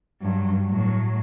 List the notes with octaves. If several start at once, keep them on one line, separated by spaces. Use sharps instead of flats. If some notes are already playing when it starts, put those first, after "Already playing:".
G2 F#3
A2 F#3